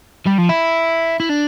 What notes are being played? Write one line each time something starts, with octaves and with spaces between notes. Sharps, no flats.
G3
F3
E4
E4
D4